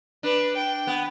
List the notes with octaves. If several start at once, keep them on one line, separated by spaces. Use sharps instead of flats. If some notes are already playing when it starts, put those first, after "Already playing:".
D4 B4
G5
B3